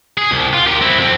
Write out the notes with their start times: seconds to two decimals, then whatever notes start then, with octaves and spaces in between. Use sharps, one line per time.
0.17 G#4
0.31 C2
0.53 F4
0.67 G4 A#4
0.82 C4 E4
0.98 F2 C4